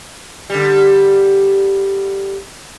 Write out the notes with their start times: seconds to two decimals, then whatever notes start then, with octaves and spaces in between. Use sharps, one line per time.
0.50 D3 G3